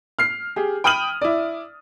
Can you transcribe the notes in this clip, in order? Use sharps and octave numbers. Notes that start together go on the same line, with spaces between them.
F6 C7
G4 G#4
G5 B5 D#6 F6 D#7 F#7
E4 D5